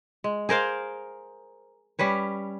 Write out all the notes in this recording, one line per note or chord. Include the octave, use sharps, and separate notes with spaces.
G#3
G#4 A#4 C5 F5
G3 C#4 B4 C#5